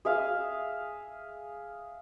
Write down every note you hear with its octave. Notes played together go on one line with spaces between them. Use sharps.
G#4 E5 F5